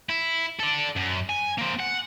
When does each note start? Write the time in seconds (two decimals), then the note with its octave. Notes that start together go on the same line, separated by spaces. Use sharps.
0.09 E4
0.60 A4 D5
0.97 F#2
1.30 G#5
1.58 A#3 C4
1.79 F#5